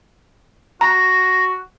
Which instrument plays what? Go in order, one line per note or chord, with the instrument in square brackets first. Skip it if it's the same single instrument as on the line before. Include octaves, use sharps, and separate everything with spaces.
[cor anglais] F#4 [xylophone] A#5 [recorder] A#6